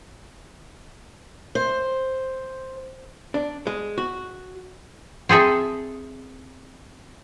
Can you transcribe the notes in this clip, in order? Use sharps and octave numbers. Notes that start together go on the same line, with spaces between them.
C5
D4
G#3
F#4
C4 G#4 A4 E5